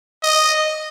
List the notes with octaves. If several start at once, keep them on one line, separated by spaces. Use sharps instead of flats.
D#5